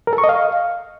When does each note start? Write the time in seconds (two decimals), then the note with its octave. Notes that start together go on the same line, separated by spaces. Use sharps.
0.07 A#4
0.13 A4
0.18 C#6
0.24 D#5
0.29 F5